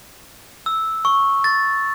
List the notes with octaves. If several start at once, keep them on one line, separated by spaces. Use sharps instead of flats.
E6
C#6
A6